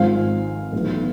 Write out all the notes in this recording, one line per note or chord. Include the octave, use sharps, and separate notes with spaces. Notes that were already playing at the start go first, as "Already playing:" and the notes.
Already playing: G#1 G#2 F3 G#3 C4 F5
B1 A2 E3 B3